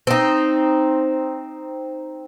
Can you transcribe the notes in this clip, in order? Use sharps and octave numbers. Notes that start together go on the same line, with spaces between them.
C4 D#4